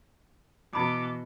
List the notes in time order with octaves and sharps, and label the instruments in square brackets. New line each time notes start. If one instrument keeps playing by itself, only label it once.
[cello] B2 E3 [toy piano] E4 B5 D#6 [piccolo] D6